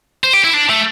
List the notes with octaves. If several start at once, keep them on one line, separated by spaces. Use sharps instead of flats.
C5
G4
E4
D4
A3